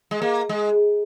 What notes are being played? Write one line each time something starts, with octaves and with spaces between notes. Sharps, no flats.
G#3
A#3
G#3